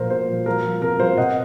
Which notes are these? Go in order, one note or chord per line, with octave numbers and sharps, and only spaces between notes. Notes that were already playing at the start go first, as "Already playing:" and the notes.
Already playing: A#2 F3 A#4 C5
A#2 C5
F3
F3 A#4
F3
C3 A#4
F3 C5
C3 D#5 F#5